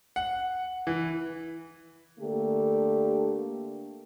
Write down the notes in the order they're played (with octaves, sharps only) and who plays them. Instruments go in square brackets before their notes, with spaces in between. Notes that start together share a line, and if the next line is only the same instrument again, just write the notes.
[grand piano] F#5
E3
[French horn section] D3 A3 A#3 D4 G4 A4